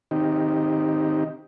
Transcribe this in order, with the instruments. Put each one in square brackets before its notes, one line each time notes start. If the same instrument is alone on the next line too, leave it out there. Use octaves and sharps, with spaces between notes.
[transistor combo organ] D#3 C4 D#4 G4